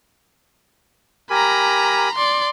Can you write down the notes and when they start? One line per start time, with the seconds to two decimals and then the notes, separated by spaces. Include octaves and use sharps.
1.30 G4 A#4 G#5 A#5 B5
2.14 D5 C6